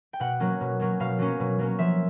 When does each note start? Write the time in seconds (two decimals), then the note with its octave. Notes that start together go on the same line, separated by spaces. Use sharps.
0.13 G5
0.20 B2 F#5
0.40 F#3 A#3 C#4
0.61 B2
0.80 F#3 A#3 C#4
1.00 B2 F5
1.19 F#3 A#3 C#4
1.40 B2
1.59 F#3 A#3 C#4
1.79 F3 E5